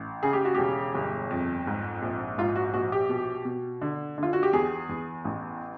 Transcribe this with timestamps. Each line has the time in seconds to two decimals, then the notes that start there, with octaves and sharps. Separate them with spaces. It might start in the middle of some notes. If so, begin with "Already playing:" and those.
Already playing: A1
0.23 C#3 G#4
0.33 G4
0.45 F#4
0.55 E1 G4
0.94 G1
1.30 F2
1.67 G#2
2.02 A#1
2.38 G#2 F4
2.56 F#4
2.74 A#1 F#4
2.92 G4
3.09 B2
3.45 B2
3.81 D3
4.18 D3
4.23 F4
4.33 F#4
4.43 G4
4.53 E2 G#4
4.89 E2
5.25 A1